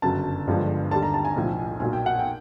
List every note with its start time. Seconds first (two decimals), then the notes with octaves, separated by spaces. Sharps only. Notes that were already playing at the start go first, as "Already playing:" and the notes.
0.02 G1 F#2 C#3 F#3 A5
0.47 G1 G2 D3 F3 G#3
0.91 D#2 D3 G3 A5
1.03 A#5
1.14 A5
1.25 G#5
1.36 B1 A2 F3
1.80 B1 A#2 F#3 G#5
1.93 G5
2.06 F#5
2.19 G5